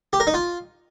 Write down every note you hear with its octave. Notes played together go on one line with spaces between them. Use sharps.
G4
A#4
D#4
F4